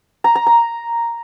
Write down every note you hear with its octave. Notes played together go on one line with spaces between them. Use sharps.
A#5
A#5
A#5